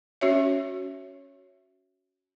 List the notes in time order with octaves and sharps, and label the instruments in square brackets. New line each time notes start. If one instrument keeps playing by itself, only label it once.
[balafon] C#4 F#4 C#5 E5